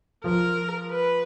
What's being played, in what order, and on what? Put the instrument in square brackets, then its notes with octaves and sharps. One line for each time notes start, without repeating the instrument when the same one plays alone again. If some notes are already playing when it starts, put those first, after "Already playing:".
[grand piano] F3 [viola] A#4
[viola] B4